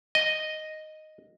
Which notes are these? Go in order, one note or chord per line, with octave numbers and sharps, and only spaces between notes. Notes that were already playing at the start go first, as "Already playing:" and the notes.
D#5